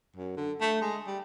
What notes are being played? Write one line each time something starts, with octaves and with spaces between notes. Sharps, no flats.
F#2
D3
A3
G#3
G3